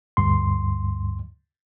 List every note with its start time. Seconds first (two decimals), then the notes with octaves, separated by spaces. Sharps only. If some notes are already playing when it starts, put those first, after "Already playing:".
0.17 D2 G2 C6